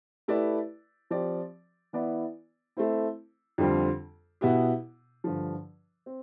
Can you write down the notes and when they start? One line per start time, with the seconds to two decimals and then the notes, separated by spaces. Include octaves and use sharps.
0.28 A3 E4 G4 B4 D5
1.10 F3 C4 G4 D5
1.93 E3 B3 E4 B4 D5
2.77 A3 C4 E4
3.58 F2 D3 G3 C4 F4
4.41 B2 B3 E4 G4
5.24 G2 D3 F3
6.06 C4